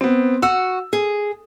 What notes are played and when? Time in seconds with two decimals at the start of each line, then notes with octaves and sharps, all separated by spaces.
0.01 B3 C4
0.42 F#4 F#5 E6
0.93 G#4